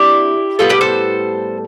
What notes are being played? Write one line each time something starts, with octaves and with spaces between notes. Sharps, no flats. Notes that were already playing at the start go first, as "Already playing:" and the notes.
Already playing: C3 D4 E4 G4
A2 G3 B3 F4 A4
G4 B4
A4 C5